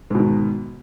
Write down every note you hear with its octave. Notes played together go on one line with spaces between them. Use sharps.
G#2 B2 D#3